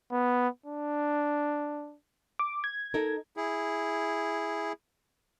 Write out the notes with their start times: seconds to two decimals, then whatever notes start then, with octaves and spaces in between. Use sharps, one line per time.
0.11 B3
0.66 D4
2.39 D6
2.64 G#6
2.94 D#4 A4 A#4
3.37 E4 G#4